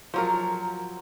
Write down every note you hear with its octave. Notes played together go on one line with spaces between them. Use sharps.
F3 F#3 A#4